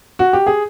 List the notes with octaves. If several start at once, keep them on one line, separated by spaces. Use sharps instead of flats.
F#4
G4
G#4